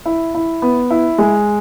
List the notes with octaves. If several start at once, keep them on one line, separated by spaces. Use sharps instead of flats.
E4
E4
B3
E4
G#3